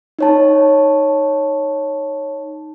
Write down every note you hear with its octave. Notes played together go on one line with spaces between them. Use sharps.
D#4 C#5 A5